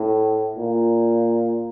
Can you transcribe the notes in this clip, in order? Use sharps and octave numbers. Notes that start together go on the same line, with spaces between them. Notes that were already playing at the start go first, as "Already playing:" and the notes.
Already playing: A2
A#2